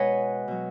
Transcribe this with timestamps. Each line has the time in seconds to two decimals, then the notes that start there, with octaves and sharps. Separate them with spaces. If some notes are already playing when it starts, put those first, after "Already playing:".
Already playing: B2 G#3 B4 C#5 D#5 F#5 G#5
0.48 B2 F#3